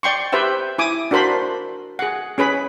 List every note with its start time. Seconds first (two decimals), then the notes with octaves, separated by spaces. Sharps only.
0.03 D5 G5 C6 C#6
0.32 G4 B4 C5 E5 G5
0.78 E4 G#5 D6 D#6
1.11 D4 F#4 A#4 C5 B5 C6
1.99 G#4 F#5
2.38 C#4 G#4 B4 B5